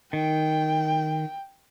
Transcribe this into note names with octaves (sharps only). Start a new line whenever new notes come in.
D#3 G5